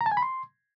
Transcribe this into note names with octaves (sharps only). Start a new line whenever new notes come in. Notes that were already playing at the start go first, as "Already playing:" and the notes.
A#5
A5
G#5
B5
C6